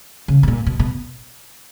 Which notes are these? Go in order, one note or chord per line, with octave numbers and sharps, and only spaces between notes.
C#3
B2
A#2
B2
B2